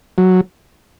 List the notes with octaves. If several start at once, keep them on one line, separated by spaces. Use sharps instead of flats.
F#3